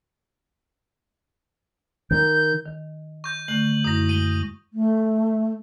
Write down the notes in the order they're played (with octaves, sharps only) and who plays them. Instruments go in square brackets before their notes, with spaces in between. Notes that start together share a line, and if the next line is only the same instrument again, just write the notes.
[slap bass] D#3 [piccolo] G6
[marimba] D#3
[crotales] C#6 G6
[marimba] D3 A3 [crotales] F#7
[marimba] F#2 E4 [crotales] D#6 A#6
[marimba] G#3 [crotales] D#7 G7
[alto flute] A3